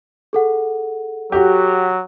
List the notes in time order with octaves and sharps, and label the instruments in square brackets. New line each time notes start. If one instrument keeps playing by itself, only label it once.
[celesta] G#4 A4 F#5
[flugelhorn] F#3 [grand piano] F#4 G4